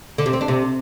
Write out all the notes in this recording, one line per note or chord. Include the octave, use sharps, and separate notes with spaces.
D3
C3
C4
D4
C3